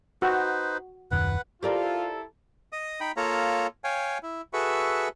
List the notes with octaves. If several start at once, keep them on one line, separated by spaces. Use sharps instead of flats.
D#4 F#4 B4 C5
D#1 F#2 D#3 B4 F#5
E4 F4 G4 A4 A#4 D5
D#5 D#6
D#4 G5 B5
A#3 F4 A4 C#5 A#5
C#5 F5 G5 G#5
E4
F#4 G#4 A4 B4 E5 C#6